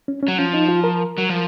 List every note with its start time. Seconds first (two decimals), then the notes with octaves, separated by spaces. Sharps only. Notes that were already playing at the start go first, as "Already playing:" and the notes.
0.08 C#4
0.23 C#4
0.28 F#3
0.38 F3 C#4
0.54 D#4
0.69 F4
0.84 A#4
1.18 F#3
1.29 F3